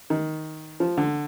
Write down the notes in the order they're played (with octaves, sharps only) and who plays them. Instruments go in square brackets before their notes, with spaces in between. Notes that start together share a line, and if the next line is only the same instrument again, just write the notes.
[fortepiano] D#3
F3
D3